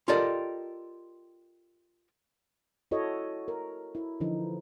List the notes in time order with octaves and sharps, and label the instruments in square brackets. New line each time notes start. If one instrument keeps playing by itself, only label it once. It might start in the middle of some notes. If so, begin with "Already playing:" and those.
[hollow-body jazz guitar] F4 G4 A4 A#4 D5 D#5
[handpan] E4 F#4 A4 C#5 D#5
A#4
E4
D3 E3 F3 D#4